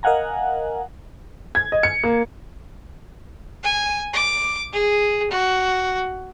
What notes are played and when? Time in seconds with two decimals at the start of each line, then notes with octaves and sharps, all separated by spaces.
0.03 A#4 D#5 F5 F#5 G#5 A#5
1.55 G#6
1.72 D#5
1.83 C#7
2.03 A#3
3.63 G#5
4.13 D6
4.73 G#4
5.31 F#4